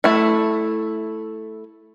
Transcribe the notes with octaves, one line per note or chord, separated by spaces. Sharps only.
A3 E4